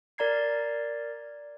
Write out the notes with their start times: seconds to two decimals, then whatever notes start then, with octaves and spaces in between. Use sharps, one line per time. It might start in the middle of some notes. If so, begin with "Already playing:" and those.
0.18 A#4 D5 A#5 G#6 C7